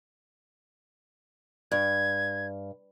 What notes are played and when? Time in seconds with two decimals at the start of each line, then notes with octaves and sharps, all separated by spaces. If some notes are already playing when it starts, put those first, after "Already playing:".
1.72 G2 G#6